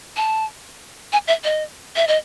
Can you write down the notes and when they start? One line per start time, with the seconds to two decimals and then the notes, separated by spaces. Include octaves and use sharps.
0.17 A5
1.13 G#5
1.27 E5
1.44 D#5
1.96 E5
2.07 D#5